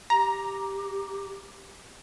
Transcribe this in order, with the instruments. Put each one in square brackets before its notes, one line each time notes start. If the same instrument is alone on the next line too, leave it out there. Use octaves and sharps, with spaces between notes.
[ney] G4 [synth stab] A#5